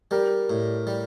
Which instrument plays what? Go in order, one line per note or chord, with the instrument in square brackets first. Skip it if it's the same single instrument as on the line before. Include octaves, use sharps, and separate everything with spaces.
[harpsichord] G3 [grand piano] G4 A#4
[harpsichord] A2
G3